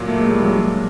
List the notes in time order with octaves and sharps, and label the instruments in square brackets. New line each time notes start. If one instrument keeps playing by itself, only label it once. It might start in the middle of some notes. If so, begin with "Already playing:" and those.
Already playing: [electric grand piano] A#2 F#3
[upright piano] A3 [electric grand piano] A#3
[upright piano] G#3
[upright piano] G3 [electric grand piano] A#3
[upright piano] F#3 G#3
[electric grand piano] D4